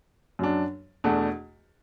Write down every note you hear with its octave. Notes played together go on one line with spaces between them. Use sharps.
F#2 F#3 D4
E2 B2 A3 D4 F#4